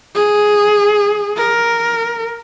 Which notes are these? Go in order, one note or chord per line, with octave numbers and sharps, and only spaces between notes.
G#4
A#4